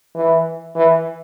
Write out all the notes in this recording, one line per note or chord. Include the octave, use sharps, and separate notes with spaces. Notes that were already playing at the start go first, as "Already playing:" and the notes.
E3
E3